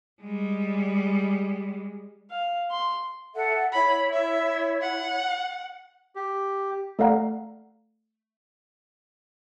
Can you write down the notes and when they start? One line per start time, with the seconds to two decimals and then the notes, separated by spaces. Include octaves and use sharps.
0.22 G3 G#3
2.31 F5
2.71 C6
3.34 A4 E5 F#5
3.72 E4 C#5 B5
4.12 E5
4.82 F#5
6.15 G4
6.99 A3 A4 D5 F5 F#5 A#5